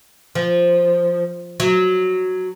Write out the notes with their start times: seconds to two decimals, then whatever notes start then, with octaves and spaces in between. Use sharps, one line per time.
0.35 F3
1.60 F#3